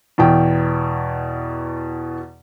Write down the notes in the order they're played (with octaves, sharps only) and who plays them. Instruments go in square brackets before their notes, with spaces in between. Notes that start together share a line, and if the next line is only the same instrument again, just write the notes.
[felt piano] E2 B2 G5